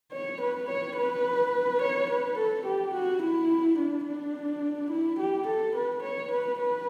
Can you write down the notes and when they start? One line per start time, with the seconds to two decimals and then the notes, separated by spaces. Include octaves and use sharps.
0.12 C#5
0.41 B4
0.69 C#5
0.97 B4
1.82 C#5
2.10 B4
2.38 A4
2.66 G4
2.94 F#4
3.22 E4
3.78 D4
4.06 D4
4.91 E4
5.19 G4
5.47 A4
5.76 B4
6.03 C#5
6.31 B4
6.59 B4